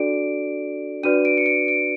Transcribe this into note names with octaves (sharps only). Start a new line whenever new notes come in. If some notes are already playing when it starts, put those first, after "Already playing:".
Already playing: D4 F#4 A4 D5 D7
D4 F#4 B4 D5 D#7
D7
C#7
D7
D7